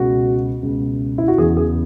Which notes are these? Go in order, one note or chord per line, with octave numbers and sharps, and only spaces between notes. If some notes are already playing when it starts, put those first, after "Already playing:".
Already playing: C#2 B2 F#4
C#2 B2
E4
F#4
E2 C#3 E3 G#4
G#4